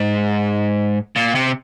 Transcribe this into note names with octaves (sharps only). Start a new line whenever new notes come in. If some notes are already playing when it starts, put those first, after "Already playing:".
Already playing: G#2
A#2
C3